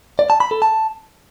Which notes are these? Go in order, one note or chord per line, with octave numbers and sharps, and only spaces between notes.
D5
A5
B5
A4
A5